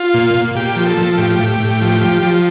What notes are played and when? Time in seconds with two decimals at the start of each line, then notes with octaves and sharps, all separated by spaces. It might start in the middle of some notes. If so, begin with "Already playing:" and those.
Already playing: F4
0.14 A#2
0.34 A#2
0.55 A#2 G4
0.76 F3
0.86 A4
0.97 F3
1.14 A4
1.18 A2 G4
1.39 A2
1.60 A2
1.81 F3
2.01 F3
2.22 F3